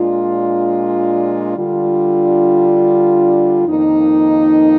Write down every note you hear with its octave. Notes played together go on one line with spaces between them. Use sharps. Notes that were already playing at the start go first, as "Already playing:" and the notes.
Already playing: A#2 G#3 D4 F4
D3 G3 D4 F4
F2 D#3 A#3 D#4